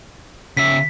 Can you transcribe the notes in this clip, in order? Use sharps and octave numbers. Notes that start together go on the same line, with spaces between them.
C#3 E5 B6